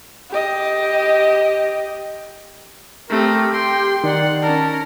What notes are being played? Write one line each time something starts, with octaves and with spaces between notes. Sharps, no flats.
G4 D#5
A3 C4 G4 A#4
G5 C6
D#3 D5 F#5
C#4 A#4 A5